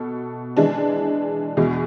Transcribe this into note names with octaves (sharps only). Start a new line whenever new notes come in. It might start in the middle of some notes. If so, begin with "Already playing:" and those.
Already playing: B2 A4
E3 G#3 D4
E2 B2 G#3